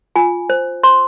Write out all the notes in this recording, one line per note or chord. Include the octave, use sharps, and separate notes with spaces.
F4 G#5
C5
C5 C6